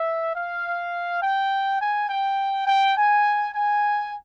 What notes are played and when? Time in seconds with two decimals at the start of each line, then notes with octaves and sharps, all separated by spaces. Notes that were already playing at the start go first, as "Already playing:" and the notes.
Already playing: E5
0.35 F5
1.22 G5
1.80 G#5
2.09 G5
2.66 G5
2.95 G#5
3.53 G#5